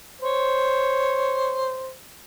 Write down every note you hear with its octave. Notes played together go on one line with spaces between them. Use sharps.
C5 C#5